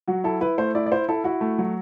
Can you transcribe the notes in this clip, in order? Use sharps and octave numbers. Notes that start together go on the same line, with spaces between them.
F#3 F#4
E4 A4
E4 B4
A3 C5
E4 D5
D5
E4 C5
E4 A4
E4 F#4
A3
F#3